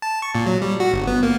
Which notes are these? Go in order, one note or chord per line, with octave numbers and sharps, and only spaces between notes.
A5
C#6
A#2
F#3
G3
F#4
G1
B3
A#3